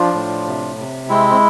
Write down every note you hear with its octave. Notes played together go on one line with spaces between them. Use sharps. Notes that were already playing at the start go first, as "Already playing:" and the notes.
Already playing: F3 D4 F4
A2
C3
C3
G#3 C4 E4